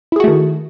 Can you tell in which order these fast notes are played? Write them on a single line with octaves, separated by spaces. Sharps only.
E4 G#4 F#4 A3 D#3